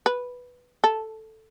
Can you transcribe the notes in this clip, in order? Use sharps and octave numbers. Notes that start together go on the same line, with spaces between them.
B4
A4